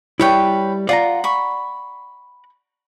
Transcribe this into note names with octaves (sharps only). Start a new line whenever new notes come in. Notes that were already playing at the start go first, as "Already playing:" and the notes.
G3 E4 B4 C#5 G5
F4 D5 F#5 A#5
B5 C#6